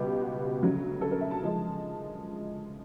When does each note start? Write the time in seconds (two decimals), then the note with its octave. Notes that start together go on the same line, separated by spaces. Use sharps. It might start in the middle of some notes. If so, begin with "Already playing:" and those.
Already playing: C#2 B2 G3 B3 G4
0.21 F#4
0.62 D2 C#3 F#3
1.01 A4
1.11 A#4
1.21 E5
1.31 A5
1.43 F3 G#3